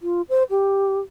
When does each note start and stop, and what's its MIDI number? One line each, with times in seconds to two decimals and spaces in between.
0.01 0.22 65
0.29 0.43 72
0.50 0.99 67